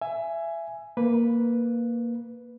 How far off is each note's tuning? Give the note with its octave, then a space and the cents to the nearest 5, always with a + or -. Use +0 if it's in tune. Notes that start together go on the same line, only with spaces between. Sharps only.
E5 +20 G#5 +5
A#3 +0 B4 +0